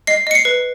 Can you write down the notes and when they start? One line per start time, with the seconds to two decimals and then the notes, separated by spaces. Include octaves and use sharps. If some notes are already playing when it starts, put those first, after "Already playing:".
0.07 D#5 C7
0.27 D#5 C#7
0.35 C7
0.45 B4